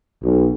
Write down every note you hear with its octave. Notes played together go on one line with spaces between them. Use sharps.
B1